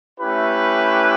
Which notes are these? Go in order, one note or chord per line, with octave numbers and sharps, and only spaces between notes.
A3 C#4 E4 G4 B4